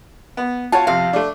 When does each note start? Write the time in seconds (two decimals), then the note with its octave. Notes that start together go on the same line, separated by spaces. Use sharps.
0.37 B3
0.72 F4 F#4 C#5 A5
0.87 F2 C3 F5
1.13 A3 D4